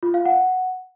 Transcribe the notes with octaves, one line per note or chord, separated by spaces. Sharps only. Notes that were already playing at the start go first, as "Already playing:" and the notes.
F4
F5
F#5